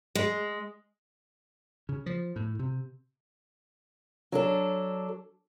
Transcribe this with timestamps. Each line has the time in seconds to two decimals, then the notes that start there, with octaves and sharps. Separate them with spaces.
0.15 G#3
1.89 C#3
2.06 F3
2.36 A2
2.59 C3
4.32 F#3 D4 A4